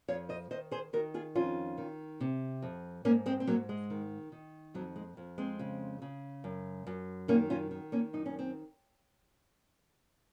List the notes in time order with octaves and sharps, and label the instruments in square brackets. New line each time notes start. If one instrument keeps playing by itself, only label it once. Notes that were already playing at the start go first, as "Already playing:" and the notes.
[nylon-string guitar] F2 C#5 F5
C5 D#5
D#3 C5 D#5
G#4 C5
D#3 F#4 A#4
F4 G#4
F2 C#4 F4
D#3
C3
F2
G#2 A#3 C#4
G#3 C4
C4
G#2 F#3 A#3
G#3
D#3
D#3
F2 F#3
G#3
F2
G#3 C4
C#3
C#3
F#2
F#2
D#3 A#3 C#4
C#4 F4
D#3
A#3 C#4
F#2 D#4
C#4
C4